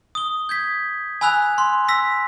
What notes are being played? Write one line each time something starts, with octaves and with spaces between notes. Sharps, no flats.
D#6 G7
G6 G#6 B6
G#5 B5 E6 F#6 F7
C6
E6 A#6 B6